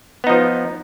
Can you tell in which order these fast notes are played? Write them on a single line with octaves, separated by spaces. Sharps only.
B3 D#4 F3